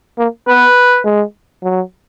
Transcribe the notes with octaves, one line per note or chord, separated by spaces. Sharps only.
A#3
B3 B4
G#3
F#3